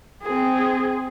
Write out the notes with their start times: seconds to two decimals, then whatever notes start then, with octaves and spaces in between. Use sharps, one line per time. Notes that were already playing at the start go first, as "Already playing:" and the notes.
0.22 C4 G#4